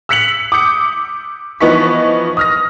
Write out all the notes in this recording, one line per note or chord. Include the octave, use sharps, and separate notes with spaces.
E6 F#6 B6 C#7 F7 F#7
D6 D#6 G6 C#7
E3 F3 B3 D#4 C#6 B6
D#6 F6 A#6